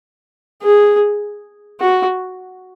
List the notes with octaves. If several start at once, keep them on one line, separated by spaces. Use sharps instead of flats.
G#4
F#4